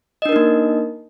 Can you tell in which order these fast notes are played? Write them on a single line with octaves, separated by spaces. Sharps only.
D#5 D4 A#4 D#4 A#3